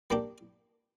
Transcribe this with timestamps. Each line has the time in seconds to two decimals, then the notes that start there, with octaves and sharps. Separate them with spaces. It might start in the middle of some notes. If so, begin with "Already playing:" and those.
0.10 G3 A#3 D4 G4